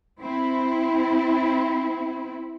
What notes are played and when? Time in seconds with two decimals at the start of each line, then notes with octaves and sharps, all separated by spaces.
0.21 C4 E4